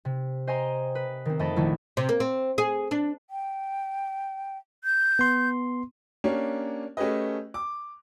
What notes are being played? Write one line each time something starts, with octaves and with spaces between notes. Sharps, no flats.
C3
C5 D#5 G5 G#5 A#5 C6
B4
D#3 C4
F2 A3 D#5 G5 A5 B5
A#1 D#3 A3 E4
C3
A#3
C4
G#4
D4
G5
G6
B3 C6
A#3 C#4 D4 G4 C#5
A3 C#4 G4 G#4 B4 D#5
D6